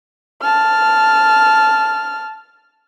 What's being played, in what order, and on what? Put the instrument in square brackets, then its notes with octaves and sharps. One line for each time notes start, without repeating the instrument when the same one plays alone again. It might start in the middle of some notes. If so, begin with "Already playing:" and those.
[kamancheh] A5 F6